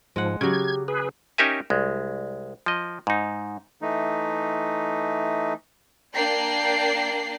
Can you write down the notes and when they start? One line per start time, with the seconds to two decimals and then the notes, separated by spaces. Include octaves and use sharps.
0.16 G#2 F3 G#3 F#5
0.41 C#3 F#3 G4 G#6
0.88 G#4 B4
1.38 C#4 D#4 G4 A#4 E5 G#5
1.70 C2 G#3
2.66 F3 D#5
3.07 G#2 D#4
3.82 E3 A3 D#4
6.15 A#3 D4 D5 G5 A#5 C7